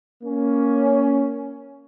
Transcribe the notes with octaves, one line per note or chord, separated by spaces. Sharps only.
A#3 C#4